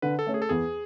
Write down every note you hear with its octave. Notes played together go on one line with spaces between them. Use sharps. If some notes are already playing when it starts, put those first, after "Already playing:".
D3 B4
A4
A3 C#4
G#4
A4
E2 G#4